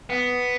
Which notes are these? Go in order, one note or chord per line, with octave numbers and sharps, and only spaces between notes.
B3